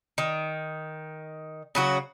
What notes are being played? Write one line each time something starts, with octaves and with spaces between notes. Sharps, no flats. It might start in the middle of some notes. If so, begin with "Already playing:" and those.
D#3
C#3 F#3 F#4